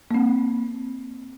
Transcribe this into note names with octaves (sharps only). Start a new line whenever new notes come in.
A#3 C4